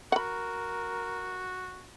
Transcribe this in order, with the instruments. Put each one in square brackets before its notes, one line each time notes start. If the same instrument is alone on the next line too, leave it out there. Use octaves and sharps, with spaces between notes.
[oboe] F#4 [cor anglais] A#4 [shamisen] F#5 B5